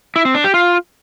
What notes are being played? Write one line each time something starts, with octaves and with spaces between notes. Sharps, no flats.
E4
C4
D4
G4
F4